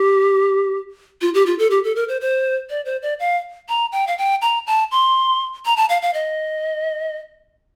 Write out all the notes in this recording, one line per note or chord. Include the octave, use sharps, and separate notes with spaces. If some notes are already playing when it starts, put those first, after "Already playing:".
Already playing: G4
F4
G4
F4
A4
G4
A4
A#4
C5
C5
D5
C5
D5
F5
A#5
G5
F5
G5
A#5
A5
C6
A#5
A5
F5
F5
D#5